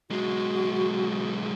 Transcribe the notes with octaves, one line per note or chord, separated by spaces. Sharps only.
B1 G#3 F#4